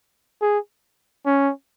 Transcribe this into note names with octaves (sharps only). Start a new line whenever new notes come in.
G#4
C#4